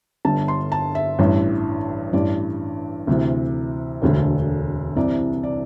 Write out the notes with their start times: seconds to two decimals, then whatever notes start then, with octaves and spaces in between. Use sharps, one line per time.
0.25 G1 G2 D3 A5
0.48 C6
0.72 A5
0.95 E5
1.19 A1 G2 E3
2.13 A1 G2 E3 D5
3.07 D2 C3 E3
4.02 E1 D2 D3
4.96 C2 C3 E3 D5
5.43 D5